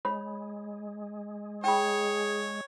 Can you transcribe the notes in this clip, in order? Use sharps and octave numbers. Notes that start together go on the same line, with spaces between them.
G#3 C#5 B5
G#4 C#5 G5 B5